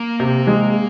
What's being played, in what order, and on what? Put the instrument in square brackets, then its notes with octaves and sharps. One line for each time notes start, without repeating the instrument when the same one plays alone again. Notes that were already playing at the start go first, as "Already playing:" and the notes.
Already playing: [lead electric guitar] A#3
[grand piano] C3
G#3